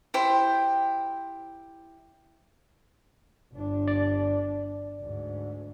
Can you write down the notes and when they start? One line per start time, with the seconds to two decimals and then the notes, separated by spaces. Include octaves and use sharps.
0.14 E4 G4 C5 G5
3.53 G1 D4
3.88 D5
5.02 D2 G#2